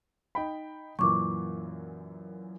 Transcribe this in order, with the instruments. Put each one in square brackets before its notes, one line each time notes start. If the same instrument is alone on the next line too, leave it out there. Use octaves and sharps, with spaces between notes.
[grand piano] D#4 G5 B5
[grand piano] F#2 A#2 E3 [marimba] C#6 D6